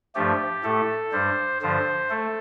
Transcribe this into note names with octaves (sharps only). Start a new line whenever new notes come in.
G2 F3 A3 G4
A2 A3 A4
G2 G3 C5
G2 D3 F3 C5
A3 A4